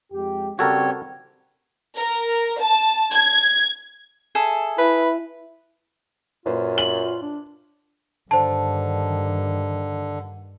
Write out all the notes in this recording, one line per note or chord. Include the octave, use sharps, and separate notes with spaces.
F2 G#3 G4
C#3 G3 C4 F#4 A4 A#4 C#5
A#4
A5
G#6
G#4 A4 E5
E4 B4
F#2 A#2 F4 B4 C5
F#7
D4
G2 D3 D#3 C5 A5